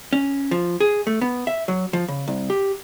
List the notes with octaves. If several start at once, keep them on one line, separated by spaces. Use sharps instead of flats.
C#4
F3
G#4
A3
B3
E5
F#3
F3
C#3
C2
G4